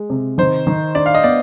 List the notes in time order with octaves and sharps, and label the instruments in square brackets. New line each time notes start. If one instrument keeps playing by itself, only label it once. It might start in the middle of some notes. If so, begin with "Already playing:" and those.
Already playing: [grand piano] G#3
C3
[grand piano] D#3 [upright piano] C5
[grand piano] D#3
[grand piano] D4 [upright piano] D5
[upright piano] F5
D#5
[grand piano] B3 [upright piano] D5